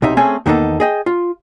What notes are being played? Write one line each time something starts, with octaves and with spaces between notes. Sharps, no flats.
B1 C3 D#4 E5
A3 C4 C#4 G#4 G#5
E2 D#3 A#3 B3 D#4 A4
G#4 D#5 G5
F4